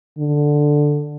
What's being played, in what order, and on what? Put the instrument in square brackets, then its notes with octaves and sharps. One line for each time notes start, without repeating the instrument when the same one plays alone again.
[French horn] D3